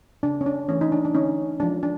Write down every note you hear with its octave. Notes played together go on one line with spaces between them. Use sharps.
C#3 D4
C#4
D4
E3 A3 C#4
D#4
D4
D4
D3 C#4 D#4
F3 G#3 D4
D4